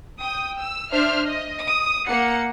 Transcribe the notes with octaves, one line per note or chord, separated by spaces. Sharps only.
G5 D#6
E6
D4 C5 E5 F6
D#5
D#6
A#3 F#5 C#7